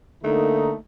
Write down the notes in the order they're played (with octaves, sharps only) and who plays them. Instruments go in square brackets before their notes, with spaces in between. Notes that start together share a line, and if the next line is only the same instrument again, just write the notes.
[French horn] D3 [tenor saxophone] A3 [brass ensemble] A#3 D#4